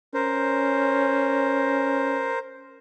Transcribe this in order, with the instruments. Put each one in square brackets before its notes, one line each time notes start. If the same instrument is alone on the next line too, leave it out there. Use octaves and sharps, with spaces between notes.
[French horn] C#4 [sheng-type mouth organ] A#4 C5